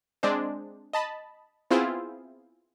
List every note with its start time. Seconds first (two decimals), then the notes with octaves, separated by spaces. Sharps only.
0.23 G#3 C4 D4 C5
0.93 D#5 A5 B5
1.70 B3 C4 E4 F4 G#4 C5